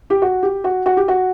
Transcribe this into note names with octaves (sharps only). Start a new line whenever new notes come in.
G4
F#4
G4
F#4
F#4
G4
F#4